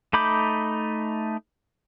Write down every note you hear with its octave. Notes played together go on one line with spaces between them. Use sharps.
A3 D#4 B5 D6 G6